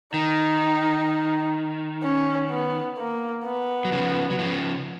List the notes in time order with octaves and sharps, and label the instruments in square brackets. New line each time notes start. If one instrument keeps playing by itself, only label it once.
[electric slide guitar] D#3 [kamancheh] D#4
[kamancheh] C#4
B3
A#3
B3
[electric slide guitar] F#3
C#3 F3
F#3
C#3 F3